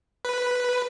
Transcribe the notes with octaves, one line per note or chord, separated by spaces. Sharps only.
B4